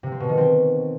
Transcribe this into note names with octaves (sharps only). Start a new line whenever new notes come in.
C3
C4
B2
D#3
C4